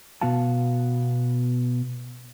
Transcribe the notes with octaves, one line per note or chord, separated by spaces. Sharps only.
B2 B3 F#4 F5 A5